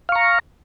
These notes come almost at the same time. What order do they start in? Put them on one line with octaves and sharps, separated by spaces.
F5 C#6 A#5